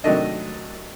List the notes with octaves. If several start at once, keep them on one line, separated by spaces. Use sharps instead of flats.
C3 D#3 F#3 A3 D4 D#5